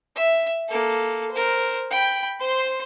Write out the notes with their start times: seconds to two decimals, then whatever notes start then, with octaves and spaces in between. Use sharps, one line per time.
0.16 E5
0.68 A#3 A4
1.32 A#4 C5
1.90 G5 B5
2.39 C5 C6